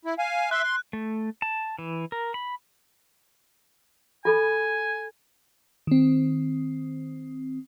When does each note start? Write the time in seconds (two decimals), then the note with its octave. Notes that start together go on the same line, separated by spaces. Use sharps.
0.05 E4
0.19 F5 G#5
0.51 E5 C6 F#6
0.64 C6
0.93 A3
1.42 A5
1.79 E3
2.12 A#4
2.34 B5
4.25 F4 A4 G#5 B5
5.87 D#3 C4